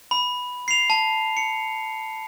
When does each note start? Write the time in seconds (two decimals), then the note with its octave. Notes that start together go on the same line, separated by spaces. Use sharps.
0.11 B5
0.68 C7 F7
0.90 A5
1.37 C#7